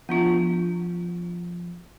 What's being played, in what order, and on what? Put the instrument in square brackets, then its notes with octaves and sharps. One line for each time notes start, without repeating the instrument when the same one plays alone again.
[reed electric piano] F3 [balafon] B3 D4 F4